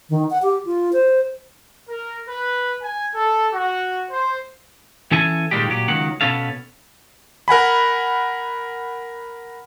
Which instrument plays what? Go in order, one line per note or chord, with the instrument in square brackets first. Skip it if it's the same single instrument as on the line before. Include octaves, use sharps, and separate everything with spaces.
[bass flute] D#3
F#5
G4
F4
C5
[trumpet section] A#4
B4
G#5
A4
F#4
C5
[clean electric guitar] E3 C#4 A4 G#5
A#2 D#3 F3 G3 G#3 G4
A#2 F#3 G4
C#2 D#3 F#3 F#5
B2 D#3 B3 C#4 A4 F5
[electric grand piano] A#4 F#5 G#5 B5